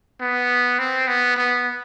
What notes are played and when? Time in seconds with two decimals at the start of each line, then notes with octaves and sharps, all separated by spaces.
0.20 B3
0.79 C4
1.07 B3
1.37 B3